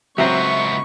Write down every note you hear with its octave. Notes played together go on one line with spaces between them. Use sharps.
C#2 F#3 B3 C4 E5 A#5 C#6 C7